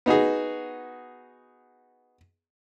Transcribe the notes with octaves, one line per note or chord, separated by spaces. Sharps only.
B3 D#4 F#4 G#4